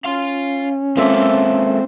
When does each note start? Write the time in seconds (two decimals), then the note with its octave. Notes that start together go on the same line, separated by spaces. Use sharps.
0.04 C#4 F5 C6
0.97 G#3 A#3 C4 F4 A4 E5